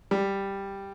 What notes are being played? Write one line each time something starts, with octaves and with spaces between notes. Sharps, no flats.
G3